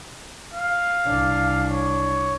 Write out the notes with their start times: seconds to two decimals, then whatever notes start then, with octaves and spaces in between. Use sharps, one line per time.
0.53 F5
1.04 C2 D4
1.71 C#5